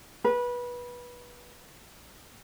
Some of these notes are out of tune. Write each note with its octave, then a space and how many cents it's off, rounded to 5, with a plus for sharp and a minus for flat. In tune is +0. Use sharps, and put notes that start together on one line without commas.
B4 -20